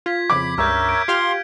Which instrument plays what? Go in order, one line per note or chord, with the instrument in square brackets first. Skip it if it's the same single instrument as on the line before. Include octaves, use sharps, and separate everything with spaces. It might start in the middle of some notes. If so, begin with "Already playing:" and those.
[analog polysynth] F4 [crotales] G#6 B6
[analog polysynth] F2 C#3 [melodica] B5 [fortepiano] D6
[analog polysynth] C#2 G2 [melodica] A#4 C#5 E5 [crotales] F6 G6
[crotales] G6 G#6 D7
[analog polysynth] F4 G4 F5 [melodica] C6 [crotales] G#6